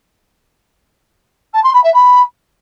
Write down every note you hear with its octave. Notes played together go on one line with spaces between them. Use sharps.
A5
C6
B5
E5
B5